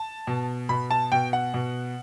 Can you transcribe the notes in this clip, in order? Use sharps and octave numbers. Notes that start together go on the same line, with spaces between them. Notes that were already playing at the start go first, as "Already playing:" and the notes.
Already playing: A5
B2
B2 B5
A5
B2 G5
F#5
B2